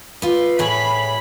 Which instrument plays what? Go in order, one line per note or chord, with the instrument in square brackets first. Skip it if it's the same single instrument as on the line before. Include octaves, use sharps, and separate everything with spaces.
[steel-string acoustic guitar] F4 B4
[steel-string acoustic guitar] A2 G#4 C#5 [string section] B5